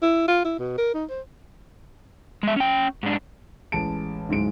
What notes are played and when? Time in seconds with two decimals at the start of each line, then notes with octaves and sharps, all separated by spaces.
0.02 E4
0.28 F4
0.45 E4
0.59 B2
0.78 A#4
0.94 D#4
1.10 C5
2.43 G#3 E5
2.56 C#4 G5
3.03 G#2 D4
3.72 A1 G#3 A5 D7
4.29 D1 G#2 G#3 D7